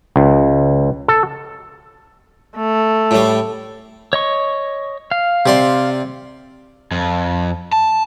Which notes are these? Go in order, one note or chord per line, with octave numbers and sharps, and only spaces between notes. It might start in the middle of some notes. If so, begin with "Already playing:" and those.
C#2
A4
A3
A2 G3
C#5 D#5 C#6
F5
C3 D5 C6
F2
A5